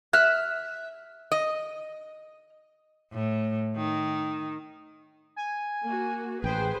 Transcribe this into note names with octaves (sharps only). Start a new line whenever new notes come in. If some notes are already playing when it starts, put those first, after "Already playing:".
E5 F6 F#6
D#5
A2
D#3
G#5
A#3 F#4
A1 G#4 B4 C5 G5